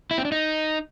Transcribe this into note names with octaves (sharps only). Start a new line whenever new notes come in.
E4
C4
D4
D#4